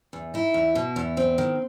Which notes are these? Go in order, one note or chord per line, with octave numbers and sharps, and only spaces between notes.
E2
D#4 E4
E2
B2
E2
C4
D#3